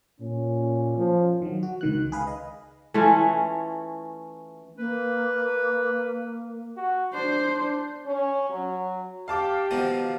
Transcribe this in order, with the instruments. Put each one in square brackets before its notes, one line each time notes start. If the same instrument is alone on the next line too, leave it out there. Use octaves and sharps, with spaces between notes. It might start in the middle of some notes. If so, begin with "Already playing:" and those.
[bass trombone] A#2 [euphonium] C#4
[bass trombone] F3
[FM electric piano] D#3 F#3
F#4
C#2 D#3 F#6
G#4 B4 F5
D#5
[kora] E3 A3 C#4 F4
[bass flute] A#3 [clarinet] B4
[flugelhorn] F#4
[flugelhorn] D4 [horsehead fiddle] C5
[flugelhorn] D4
[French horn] C#4
F#3
[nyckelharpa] G4 [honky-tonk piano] F5 A5 D6
[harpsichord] B2 D#3 F3